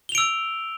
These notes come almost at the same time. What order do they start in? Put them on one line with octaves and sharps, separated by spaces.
G7 F7 D7 E6